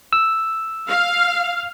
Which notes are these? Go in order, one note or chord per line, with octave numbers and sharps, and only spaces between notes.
E6
F5